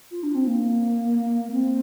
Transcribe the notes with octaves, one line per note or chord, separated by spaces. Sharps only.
F4
D4
C4
A#3
C4